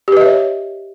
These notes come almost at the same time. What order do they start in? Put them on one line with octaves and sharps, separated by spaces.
G4 B4 D#5 E5 C#5